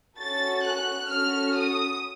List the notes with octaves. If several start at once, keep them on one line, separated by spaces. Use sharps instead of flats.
C#4 F#4 A4 A6
F#6
C#4 F#4 A4 F6
D#6